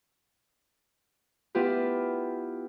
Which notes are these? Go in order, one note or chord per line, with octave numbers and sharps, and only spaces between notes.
B3 E4 F4 G4 B4